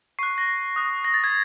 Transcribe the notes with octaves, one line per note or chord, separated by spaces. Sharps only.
C#6 F#6 C7
A#6
D#6 F#6
A#6
A6
G#6